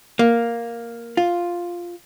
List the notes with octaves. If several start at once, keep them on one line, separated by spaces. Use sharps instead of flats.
A#3
F4